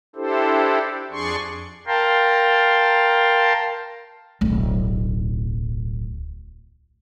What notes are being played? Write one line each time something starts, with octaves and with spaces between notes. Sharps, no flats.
D4 E4 G4 A4 C5
F2 D4 G#4 D5 C6 C#6
A#4 F5 G5 A5 A#5 C6
D1 B1